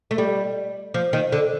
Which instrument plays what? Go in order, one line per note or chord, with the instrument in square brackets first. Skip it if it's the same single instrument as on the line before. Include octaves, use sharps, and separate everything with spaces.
[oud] A3
G3
F3
D#3
D3